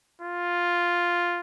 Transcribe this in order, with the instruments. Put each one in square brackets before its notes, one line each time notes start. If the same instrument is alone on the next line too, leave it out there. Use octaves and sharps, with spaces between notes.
[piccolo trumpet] F4